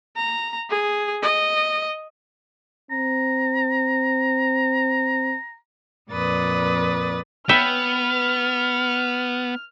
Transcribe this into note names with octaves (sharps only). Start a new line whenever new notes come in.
A#5
G#4
D#5
C4 A#5
F2 A#2 B4 D5 D#6 A6
B3 B4 E5 G5 F6